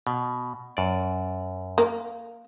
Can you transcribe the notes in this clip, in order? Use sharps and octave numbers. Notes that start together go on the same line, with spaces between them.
B2
F#2 D5
A#3